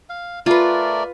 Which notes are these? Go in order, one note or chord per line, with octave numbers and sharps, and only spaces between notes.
F5
A3 F4 A#4 B4 D5